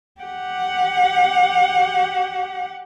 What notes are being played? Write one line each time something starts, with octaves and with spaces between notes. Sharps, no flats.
G4 F#5